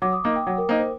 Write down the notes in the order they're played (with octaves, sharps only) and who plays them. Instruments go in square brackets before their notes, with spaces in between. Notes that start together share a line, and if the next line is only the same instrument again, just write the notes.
[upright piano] F#3 [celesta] D6
[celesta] D#6
[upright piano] A#3 D#4 [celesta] D6
[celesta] G5
[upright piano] F#3
[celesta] A#4
[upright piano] A#3 D#4 [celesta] C5
[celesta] C5